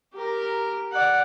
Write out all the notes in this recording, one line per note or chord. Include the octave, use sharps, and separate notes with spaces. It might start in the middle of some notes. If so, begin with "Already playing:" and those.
G4 A#4
D5 F#5